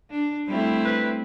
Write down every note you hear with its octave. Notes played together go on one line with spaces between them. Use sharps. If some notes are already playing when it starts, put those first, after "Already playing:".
D4
G3 A3 C4 E4
B4